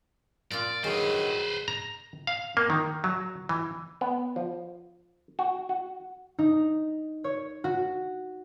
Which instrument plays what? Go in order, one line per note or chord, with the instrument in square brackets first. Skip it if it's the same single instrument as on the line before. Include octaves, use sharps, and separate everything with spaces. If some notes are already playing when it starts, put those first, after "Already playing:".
[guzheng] A#2 F4 [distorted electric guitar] D5
[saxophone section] G2 D#3 F#3 [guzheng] G#3 [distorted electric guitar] B4 C5
[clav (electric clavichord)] A#5
F5
A#3
D#3
F#3
E3
B3
F3
F#4
F#4
[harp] D#4
C#5
F#4